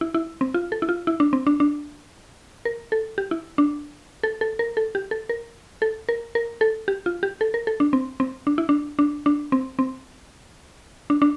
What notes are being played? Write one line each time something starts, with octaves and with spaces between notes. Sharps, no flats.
E4
E4
C4
F4
A4
E4
F4
E4
D4
C4
D4
D4
A#4
A4
G4
E4
D4
A4
A4
A#4
A4
G4
A4
A#4
A4
A#4
A#4
A4
G4
F4
G4
A4
A#4
A4
D4
C4
C4
D4
E4
D4
D4
D4
C4
C4
D4
D4